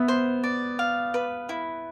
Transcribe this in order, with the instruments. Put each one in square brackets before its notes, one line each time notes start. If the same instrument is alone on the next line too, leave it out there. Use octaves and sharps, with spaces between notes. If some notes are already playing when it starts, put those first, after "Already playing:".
Already playing: [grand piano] B3 [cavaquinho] E5
[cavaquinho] C5
D5
F5
B4
E4